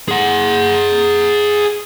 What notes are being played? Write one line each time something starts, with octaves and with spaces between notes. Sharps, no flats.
G#4 F#5